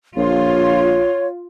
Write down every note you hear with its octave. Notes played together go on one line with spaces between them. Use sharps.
A#1 F4 C#5